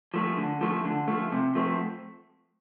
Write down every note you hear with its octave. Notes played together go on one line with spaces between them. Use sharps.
F3 A3
D3
F3 A3
D3
F3 A3
C3
F3 A3 C4